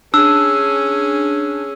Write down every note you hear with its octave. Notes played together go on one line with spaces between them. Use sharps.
C#4 D4 G#4 E6